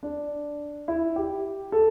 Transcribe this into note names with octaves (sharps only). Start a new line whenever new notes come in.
D4
E4
G4
A4